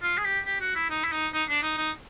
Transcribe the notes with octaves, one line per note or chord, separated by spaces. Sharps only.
F4
G#4
G4
G4
F#4
E4
D#4
E4
D#4
D#4
D4
D#4
D#4